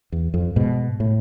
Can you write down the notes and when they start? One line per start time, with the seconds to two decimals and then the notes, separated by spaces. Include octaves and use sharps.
0.12 E2
0.34 F2
0.56 G#2 B2
1.00 A2